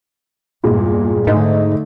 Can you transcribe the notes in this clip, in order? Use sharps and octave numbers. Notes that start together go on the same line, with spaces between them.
E2 G2 A#2 G#3
G#2 D3 A3 D#4